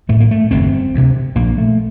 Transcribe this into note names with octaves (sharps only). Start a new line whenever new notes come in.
A1 A2 A3
A#3
A3
G1 F2 C3 C4
D2 C3
A#1 A#2 A#3
A3